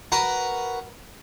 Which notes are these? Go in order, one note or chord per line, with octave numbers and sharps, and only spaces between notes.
F#4 A#4 B4